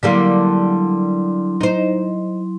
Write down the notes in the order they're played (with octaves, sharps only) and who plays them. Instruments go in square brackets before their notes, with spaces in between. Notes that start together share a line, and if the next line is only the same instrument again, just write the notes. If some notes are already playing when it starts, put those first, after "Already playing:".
[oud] D3 G3 A#3 [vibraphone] F#3 E4 C6
[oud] D#4 C5